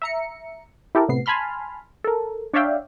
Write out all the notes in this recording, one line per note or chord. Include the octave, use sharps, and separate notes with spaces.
E5 A#5 C#7
E4 G4 A4 A#4
A2 C3 B3 C7
G#5 A5 B5 C6 F6
A4 A#4
D4 C#5 D5 E5 F5 G5